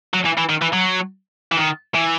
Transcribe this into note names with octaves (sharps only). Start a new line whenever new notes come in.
F#3
E3
E3
D#3
E3
F#3
E3
D#3
E3